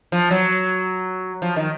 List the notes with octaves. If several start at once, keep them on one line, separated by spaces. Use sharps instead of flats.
F3
F#3
F3
D#3